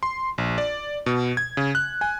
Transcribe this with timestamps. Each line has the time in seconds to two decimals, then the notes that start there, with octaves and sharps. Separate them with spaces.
0.03 C6
0.38 A#1
0.58 D5
1.06 B2
1.37 G#6
1.57 C#3
1.75 F#6
2.01 G#5